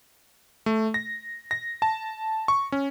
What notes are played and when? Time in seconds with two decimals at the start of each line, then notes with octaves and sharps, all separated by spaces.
0.66 A3
0.94 A#6
1.51 A#6
1.82 A5
2.48 C#6
2.72 C#4